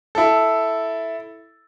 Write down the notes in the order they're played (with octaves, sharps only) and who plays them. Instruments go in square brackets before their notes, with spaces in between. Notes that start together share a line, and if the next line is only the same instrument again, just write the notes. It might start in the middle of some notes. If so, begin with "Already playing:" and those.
[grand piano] E4 A4